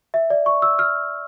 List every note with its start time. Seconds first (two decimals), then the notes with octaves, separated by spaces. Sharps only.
0.14 E5
0.30 D5
0.46 C#6
0.62 E6
0.79 F6